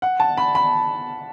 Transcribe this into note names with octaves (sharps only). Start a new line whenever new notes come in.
F#5
A5
B5
B5